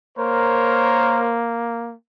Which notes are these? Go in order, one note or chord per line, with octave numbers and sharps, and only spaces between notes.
A#3 A#4 C5 C#5